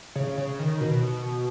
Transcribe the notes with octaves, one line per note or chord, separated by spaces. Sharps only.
C#3
C#3
D#3
B2